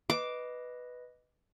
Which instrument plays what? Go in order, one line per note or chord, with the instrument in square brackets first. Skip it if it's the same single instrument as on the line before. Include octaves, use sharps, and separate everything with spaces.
[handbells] B4 D#5 [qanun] D6